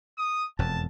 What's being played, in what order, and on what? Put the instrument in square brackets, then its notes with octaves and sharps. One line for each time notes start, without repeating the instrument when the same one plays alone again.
[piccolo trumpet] D#6
[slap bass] E1 F2 [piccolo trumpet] A5